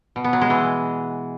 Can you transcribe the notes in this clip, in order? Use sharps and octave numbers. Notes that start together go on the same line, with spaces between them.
B2
B3
F#3
G#3
E3